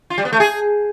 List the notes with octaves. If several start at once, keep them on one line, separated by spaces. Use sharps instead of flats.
F4
G3
B3
A3
G#4